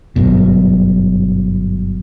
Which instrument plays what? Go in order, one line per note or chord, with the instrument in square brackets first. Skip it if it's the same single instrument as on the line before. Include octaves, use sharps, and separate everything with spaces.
[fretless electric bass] G1 F#2 B2